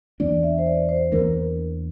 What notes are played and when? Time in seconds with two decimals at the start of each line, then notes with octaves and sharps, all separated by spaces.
0.20 E2 E3 A#3 D4 D5
0.43 E5
0.58 C5
0.66 D5
0.89 C5
1.12 E2 E3 A#3 D4 A#4